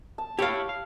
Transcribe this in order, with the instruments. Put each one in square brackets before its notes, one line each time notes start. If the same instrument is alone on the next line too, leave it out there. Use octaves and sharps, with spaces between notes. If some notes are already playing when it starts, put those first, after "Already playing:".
[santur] A5
[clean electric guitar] E4 C#5 [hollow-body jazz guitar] G4 F5
[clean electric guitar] F5